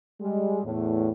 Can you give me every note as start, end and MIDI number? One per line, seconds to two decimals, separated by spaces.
0.20 0.60 55
0.20 0.60 56
0.64 1.10 40
0.64 1.10 45